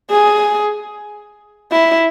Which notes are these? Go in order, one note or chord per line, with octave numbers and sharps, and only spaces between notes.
G#4
E4